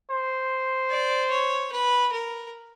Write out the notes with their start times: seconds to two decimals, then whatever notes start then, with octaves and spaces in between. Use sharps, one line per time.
0.10 C5
0.90 D5
1.31 C#5
1.72 B4
2.12 A#4